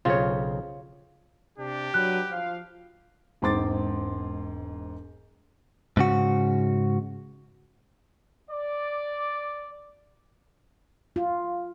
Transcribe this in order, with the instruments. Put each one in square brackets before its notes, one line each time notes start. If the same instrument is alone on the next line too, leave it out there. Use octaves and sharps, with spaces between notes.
[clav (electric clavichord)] B1 C#3 C4 [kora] F4 C#5
[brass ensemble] C3 D4 [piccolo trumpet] G4
[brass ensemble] F#3 D4 B4 [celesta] F#6
[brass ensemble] F3 F5
[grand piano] E1 G#2 C4 C6 D6 A6
[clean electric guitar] G#2 C#3 F#4
[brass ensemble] D5
[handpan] F4